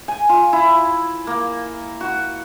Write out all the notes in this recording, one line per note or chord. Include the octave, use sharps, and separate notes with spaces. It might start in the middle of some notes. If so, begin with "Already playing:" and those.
G#5
F4
E4
A#3
F#4